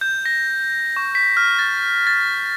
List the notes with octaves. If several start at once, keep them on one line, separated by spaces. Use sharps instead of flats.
G6
A#6
C#6
B6
F6
A6
A6